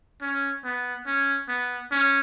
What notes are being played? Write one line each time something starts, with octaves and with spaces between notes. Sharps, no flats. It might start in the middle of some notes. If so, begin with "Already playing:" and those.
C#4
B3
C#4
B3
C#4